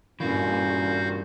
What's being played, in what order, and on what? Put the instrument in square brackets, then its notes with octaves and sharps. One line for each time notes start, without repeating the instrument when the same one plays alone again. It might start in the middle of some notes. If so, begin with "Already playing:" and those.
[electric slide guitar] G2 E3 [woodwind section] A#2 C#4 [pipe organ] F#4 F5 G6